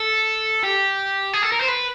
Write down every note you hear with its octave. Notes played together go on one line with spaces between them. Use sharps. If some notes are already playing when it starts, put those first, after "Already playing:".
Already playing: A4
G4
G#4
A4
A#4
C5
B4